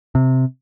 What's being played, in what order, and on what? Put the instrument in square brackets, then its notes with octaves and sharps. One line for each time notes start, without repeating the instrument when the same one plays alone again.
[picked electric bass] C3